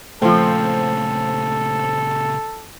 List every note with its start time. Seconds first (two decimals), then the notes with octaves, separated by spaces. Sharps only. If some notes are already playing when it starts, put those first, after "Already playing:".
0.22 A#2 C#3 F3 A3 C4 A4